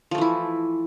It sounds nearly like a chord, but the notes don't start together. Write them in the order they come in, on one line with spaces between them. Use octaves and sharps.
F3 A3 E3 E4